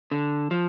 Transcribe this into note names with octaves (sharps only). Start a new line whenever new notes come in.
D3
F3